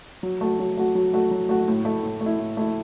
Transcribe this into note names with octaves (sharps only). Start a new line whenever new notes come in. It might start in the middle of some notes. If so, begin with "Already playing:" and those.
F#3
A3 F#4
F#3
A3 F#4
F#3
A3 F#4
F#3
A3 F#4
A2
A3 E4
A2
A3
E4
A2
A3 E4